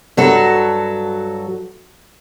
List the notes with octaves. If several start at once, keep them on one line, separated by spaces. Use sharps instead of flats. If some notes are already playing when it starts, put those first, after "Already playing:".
G2 F#3 F#4 A4